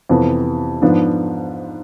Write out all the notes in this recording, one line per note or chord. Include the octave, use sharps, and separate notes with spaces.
F2 C3 E3 B3
G#2 F3 B3 D4